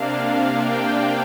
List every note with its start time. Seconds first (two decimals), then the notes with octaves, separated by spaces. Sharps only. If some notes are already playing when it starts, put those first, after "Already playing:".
Already playing: C3 A#3 D4 F5
0.58 G5